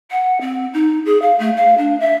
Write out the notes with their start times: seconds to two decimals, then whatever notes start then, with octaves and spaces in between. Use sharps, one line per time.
0.11 F#5
0.41 C4
0.73 D#4
1.05 G#4
1.21 F5
1.39 A3
1.57 F5
1.78 D4
2.00 E5